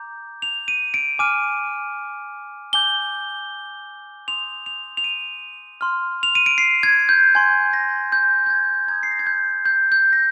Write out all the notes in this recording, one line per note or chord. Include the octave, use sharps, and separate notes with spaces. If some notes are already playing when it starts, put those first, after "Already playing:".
Already playing: A#5 D6 G6
F7
D#7
D7
G#5 D6 F6 D#7
G#5 D6 G6 G7
C6 D#6 G6 F7
F7
F7
D#7
C6 F6
F7
D#7
D7
C7
G#6
G6
G#5 C6 G6 G#6
A#6
G6
G6
G#6
A#5 D#6 G6 G#6
C7
A#6
G#6
G6
G6
G6
A#6